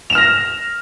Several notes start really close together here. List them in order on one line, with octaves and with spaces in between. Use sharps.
F7 E7 F6 A#6